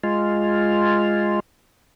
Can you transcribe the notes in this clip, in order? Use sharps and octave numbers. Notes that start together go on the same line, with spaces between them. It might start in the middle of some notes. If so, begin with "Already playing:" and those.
G#3 F4